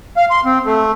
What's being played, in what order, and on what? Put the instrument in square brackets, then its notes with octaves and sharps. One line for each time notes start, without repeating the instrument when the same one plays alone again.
[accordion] F5
C6
C4
A3